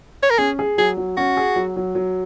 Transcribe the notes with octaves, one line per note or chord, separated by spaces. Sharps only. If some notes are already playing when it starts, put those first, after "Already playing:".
C#5
A#4
C#4 G#4
G#4
F#3 G#4
F#3
C#4 F#4
G#4
F#3
F#3
F#3